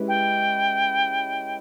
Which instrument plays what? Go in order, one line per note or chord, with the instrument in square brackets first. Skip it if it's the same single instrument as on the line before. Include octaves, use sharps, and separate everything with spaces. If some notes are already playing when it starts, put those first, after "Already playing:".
Already playing: [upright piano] G#3 C#4 E4 G4 B4
[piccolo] G5